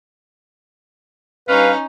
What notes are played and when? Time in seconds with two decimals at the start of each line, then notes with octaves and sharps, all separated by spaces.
1.48 G2 C#4 D#4 B4 F5